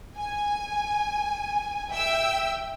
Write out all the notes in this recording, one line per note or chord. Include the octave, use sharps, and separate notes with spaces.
G#5
E5 G5 E6